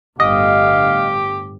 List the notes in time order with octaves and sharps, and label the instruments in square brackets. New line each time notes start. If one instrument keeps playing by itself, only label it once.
[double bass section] G1 A2 [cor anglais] G4 [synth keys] D#5 [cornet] F5